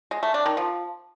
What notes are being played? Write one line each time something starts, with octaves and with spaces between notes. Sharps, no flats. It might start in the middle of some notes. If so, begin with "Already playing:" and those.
G#3
A3
D4
D#3
F3